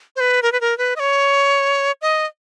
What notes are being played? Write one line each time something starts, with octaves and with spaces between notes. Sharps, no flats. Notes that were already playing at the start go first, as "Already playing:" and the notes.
C5
B4
A#4
B4
A#4
B4
D#5
C#5
D#5